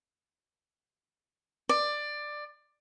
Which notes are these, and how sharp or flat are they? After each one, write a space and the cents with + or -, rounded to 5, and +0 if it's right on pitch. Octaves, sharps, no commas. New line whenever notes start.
D5 +15